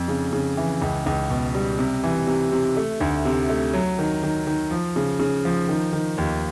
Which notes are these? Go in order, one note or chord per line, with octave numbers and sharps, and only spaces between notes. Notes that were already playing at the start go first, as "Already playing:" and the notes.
Already playing: F2
C#3
C#3
E3
C#2
C#2
B2
G3
C3
E3
C3
C3
A3
D2
C3
A3
F#3
D#3
D#3
D#3
F3
C#3
C#3
F3
D#3
D#3
D#2